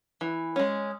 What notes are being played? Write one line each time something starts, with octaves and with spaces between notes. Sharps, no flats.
E3
G#3 C#4